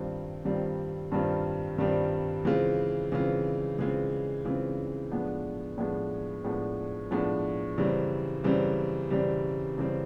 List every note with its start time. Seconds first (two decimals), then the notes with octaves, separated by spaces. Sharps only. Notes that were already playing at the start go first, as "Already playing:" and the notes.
Already playing: G2 D#3 G3 C4 F4
0.45 G2 D#3 G3 C4 F4
1.12 G2 D#3 G3 C4 F4
1.78 G2 D#3 G3 C4 F4
2.45 C#3 E3 G#3 C4 F4
3.12 C#3 E3 G#3 C4 F4
3.79 C#3 E3 G#3 C4 F4
4.45 C#3 E3 G#3 C4 F4
5.11 A2 F3 G#3 B3 D4
5.78 A2 F3 G#3 B3 D4
6.44 A2 F3 G#3 B3 D4
7.11 A2 F3 G#3 B3 D4
7.77 F#2 C#3 E3 G3 C4
8.44 F#2 C#3 E3 G3 C4
9.10 F#2 C#3 E3 G3 C4
9.77 F#2 C#3 E3 G3 C4